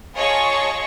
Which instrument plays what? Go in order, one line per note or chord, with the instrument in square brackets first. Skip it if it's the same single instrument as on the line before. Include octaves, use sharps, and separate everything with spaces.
[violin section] F4 G#4 C#5 D#5 A5 C#6